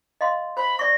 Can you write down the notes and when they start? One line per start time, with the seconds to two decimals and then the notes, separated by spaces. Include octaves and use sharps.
0.21 D#5 F5 C6
0.57 C5 B5
0.79 D5 C#6 A#6